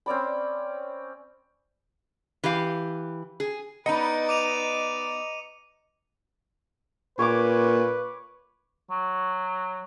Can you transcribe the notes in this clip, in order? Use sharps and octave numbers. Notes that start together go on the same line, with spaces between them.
C4 C#4 D5 B5
E3 G4 F5
G#4
B3 D#4 B4 D5 D#5 A#5 C#7
D6 D#7 F7
A#2 B4 C#5 D6
F#3